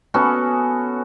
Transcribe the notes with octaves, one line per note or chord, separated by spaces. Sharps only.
B3 C#4 F#4 A4